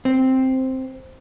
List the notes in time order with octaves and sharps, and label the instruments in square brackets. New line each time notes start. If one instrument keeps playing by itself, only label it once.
[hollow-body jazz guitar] C4